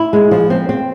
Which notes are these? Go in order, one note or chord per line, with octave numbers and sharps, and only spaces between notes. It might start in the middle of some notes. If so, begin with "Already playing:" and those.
Already playing: E4
G#3
F3
C4
C4